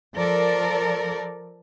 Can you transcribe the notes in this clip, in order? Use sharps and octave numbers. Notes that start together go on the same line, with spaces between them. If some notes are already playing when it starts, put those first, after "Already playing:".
F3 A4 A#4 D5